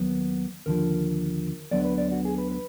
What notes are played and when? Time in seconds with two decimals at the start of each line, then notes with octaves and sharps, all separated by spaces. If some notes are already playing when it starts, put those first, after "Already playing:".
Already playing: D#2 D#3 F#3 B3
0.66 D#2 D3 F3 A#4
1.71 D2 D3 F#3 B3 D5
1.85 B4
1.98 D5
2.12 F#4
2.25 G#4
2.38 B4
2.51 B4